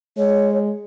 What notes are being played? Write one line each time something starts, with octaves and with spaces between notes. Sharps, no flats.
G#3 C#5